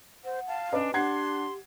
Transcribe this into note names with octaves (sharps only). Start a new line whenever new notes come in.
C5 F#5
F5 A5
C#4 D4 B4 D#5
D4 G4 F#5 C6 G#6 C7